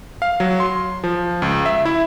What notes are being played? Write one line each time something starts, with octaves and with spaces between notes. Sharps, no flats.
F5
F#3
C6
F3
C#2
E5
E4